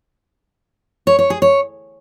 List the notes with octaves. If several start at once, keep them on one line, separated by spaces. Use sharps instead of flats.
C#5
C#5
G#4
C#5